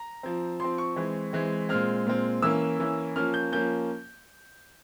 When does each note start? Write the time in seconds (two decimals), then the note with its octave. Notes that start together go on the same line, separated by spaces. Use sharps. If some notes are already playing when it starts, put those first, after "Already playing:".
Already playing: A#5
0.23 F3 C4
0.60 F3 C4 C6
0.78 C#6
0.96 E3 G#3 C4
1.33 E3 G#3 C4
1.69 A#2 G#3 C4 F6
2.07 A#2 G#3 C4
2.42 E3 A#3 C#4 E6
2.79 E3 A#3 C#4
3.16 F3 A#3 C#4 F6
3.34 G6
3.52 F3 A#3 C#4 G6